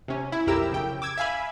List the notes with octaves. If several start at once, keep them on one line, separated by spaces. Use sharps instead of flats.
C3 C#4
E4
B1 F2 E4 G4 A#4 E6
C#3 G5
D6 E6 G#6
E5 F5 G#5 B5